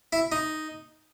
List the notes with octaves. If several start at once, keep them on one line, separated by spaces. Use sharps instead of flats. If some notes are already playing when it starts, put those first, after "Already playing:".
E4
D#4